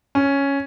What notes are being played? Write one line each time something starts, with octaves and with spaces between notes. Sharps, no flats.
C#4